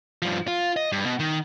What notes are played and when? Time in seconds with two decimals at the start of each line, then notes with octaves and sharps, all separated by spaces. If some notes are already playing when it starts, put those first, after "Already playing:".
0.22 G2 F3
0.48 F4
0.77 D#5
0.92 G2
1.06 B2
1.20 D#3